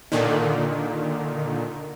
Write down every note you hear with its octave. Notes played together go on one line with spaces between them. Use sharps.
A#2 D3 D#3